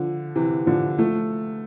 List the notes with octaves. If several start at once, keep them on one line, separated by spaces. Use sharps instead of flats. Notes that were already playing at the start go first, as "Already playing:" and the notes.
Already playing: D3 F3
C3 E3
D3 F3
F3 A3